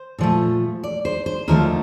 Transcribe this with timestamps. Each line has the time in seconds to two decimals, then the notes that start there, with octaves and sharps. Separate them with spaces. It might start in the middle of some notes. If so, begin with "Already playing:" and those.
Already playing: C5
0.18 A#2 F3 A3
0.83 D5
1.05 C5
1.26 C5
1.48 D#2 D3 F3 A3 A#4